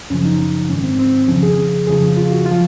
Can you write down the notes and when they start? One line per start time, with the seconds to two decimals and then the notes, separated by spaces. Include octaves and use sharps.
0.10 F#2 C#3 F3 C#4
0.25 D#4
0.69 G#2 D#3 C#4
0.84 C4
0.99 C4
1.28 F2 C#3 F3 C#4
1.43 G#4
1.87 F2 C#3 F3 G#4
2.17 F4
2.32 F#4
2.46 F4
2.51 F3